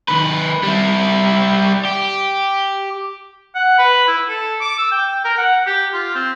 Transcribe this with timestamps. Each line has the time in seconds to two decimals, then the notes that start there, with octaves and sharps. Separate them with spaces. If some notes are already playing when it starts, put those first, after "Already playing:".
0.08 D#3 B4
0.63 G3 E4
1.85 G4
3.55 F#5
3.78 B4
4.07 E4
4.29 A4
4.60 D6
4.78 E6
4.91 G5
5.24 A#4
5.37 F#5
5.67 G4
5.93 F4
6.15 C4